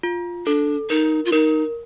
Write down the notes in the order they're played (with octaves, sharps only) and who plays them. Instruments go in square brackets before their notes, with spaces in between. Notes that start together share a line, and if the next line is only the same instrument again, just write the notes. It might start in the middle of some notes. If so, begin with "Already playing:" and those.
[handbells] F4
[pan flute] D4 [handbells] A4
[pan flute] D#4 [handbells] A#4
[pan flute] F4
[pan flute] D#4 [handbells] A#4